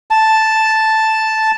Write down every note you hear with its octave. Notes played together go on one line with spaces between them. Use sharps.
A5